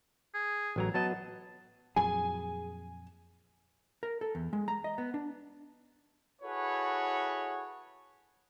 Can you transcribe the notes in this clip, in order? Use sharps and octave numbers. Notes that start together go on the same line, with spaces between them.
G#4
A1 F#3 A#5
F#3 B3 D#5 A5
F2 A#2 F#3 G#4 G#5
A#4
A4
E2
G#3
A#5
D#5
B3
D4
E4 F#4 G#4 A4 B4 C#5